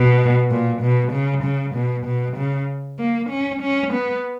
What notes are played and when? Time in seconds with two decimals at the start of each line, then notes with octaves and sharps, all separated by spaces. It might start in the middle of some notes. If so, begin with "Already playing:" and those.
Already playing: B2
0.51 A#2
0.82 B2
1.12 C#3
1.44 C#3
1.75 B2
2.06 B2
2.37 C#3
2.99 A#3
3.30 C#4
3.62 C#4
3.93 B3